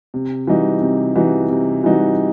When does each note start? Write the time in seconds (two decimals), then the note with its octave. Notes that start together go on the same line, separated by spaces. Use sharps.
0.14 C3
0.47 E3 G3 D#4 F#4
0.81 C3
1.16 E3 G3 D#4 F#4
1.50 C3
1.84 E3 G3 D#4 F#4